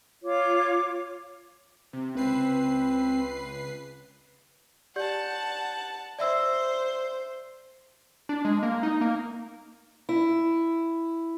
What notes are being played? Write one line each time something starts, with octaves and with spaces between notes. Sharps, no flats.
F4 C#5 D6
C3
C#2 C4 B4 C7
G4 D5 F#5 A5 G6
C5 D5 E5 E6
D4
G#3
A#3
D#4
A#3
E4